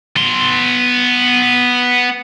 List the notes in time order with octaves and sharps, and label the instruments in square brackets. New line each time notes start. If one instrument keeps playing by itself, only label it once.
[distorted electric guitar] B3 C6